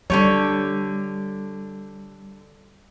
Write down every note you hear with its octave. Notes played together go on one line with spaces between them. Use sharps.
D3 G3 G4 C#5